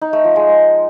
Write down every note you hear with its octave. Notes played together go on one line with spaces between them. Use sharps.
D#4
A3
F3
G#3